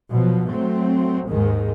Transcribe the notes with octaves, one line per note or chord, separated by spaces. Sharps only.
B2 F3 F#3
F#3 A3 C4
D#2 G#2 D#3 G#3